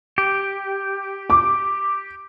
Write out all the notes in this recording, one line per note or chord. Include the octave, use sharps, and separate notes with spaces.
G4
D6